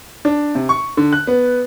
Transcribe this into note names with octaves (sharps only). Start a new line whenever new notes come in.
D4
C3
C#6
D3
F#6
B3